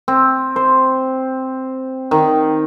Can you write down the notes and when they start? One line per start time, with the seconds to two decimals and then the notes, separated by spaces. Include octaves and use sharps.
0.08 C4
0.56 C5
2.11 D#3